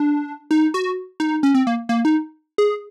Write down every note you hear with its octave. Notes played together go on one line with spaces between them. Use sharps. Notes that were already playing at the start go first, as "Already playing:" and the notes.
Already playing: D4
D#4
F#4
D#4
C#4
C4
A#3
A#3
D#4
G#4